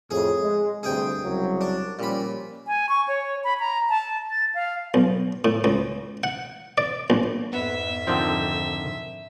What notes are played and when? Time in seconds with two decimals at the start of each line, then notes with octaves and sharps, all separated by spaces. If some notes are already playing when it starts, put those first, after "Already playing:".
0.11 F2 A2 G#4
0.40 G#3
0.83 D2 G2 C3 G#4 G5
1.22 C2 C#3 F#3
1.61 D4
1.99 A#2 F3 G3 C#4 B5
2.67 G#5
2.89 C#6
3.08 C#5
3.44 B5
3.60 A#5
3.90 A5
4.31 A6
4.55 F5
4.94 B1
5.45 A2
5.64 C#2
6.24 F#5
6.78 D5
7.10 A#1
7.53 F2 G#2 B3 E5
8.07 D3 D#3 F3 C4